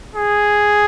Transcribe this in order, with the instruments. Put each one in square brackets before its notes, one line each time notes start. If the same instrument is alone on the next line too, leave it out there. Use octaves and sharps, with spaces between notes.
[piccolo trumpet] G#4